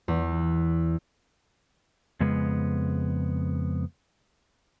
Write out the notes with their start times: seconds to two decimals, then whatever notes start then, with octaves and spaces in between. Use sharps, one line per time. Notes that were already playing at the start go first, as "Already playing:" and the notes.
0.08 E2
2.20 F2 C#3 G#3 B3